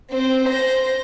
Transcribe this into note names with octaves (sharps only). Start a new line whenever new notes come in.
C4 C5
C5 A#6